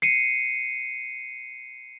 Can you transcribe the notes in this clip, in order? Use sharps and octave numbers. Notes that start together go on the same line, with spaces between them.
C7 C#7 D#7